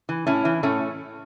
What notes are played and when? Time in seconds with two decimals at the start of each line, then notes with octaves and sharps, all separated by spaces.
0.09 E3
0.27 A2 C#4 E4
0.45 E3
0.63 A2 A3 C#4